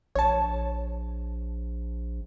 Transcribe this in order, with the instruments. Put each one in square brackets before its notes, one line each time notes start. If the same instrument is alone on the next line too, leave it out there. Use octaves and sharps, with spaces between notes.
[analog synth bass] A#1 [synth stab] C#5 A5